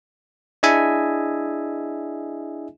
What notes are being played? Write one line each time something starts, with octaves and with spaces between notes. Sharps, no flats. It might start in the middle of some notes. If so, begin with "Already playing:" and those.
D4 E4 G#4 D#5 E5 G#5